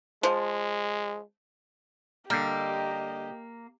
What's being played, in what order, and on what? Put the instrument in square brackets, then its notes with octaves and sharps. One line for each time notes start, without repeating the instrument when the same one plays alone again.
[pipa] F3 [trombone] G#3
[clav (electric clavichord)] D3 G3 [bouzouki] A#3 [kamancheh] G4 D#5